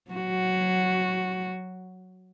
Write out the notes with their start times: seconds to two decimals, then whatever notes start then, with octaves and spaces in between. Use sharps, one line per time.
0.11 F#3 F#4